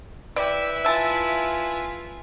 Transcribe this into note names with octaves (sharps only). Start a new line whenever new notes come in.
E4 B4 D5 E5 G5
F4 E5 G#5 A5